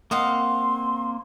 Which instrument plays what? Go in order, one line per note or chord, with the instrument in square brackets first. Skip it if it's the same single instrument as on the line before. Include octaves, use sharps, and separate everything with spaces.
[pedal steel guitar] A#3 C4 [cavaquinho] D#5 F5 F#5 [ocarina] C6